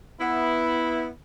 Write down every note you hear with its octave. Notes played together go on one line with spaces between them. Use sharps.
B3 E4